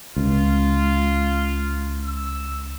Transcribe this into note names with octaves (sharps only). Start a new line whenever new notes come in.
C#2 F4
E6